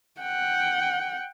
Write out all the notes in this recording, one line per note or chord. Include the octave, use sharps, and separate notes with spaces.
F#5 G5